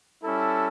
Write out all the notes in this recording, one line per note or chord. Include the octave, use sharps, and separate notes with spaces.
G3 C#4 E4 A4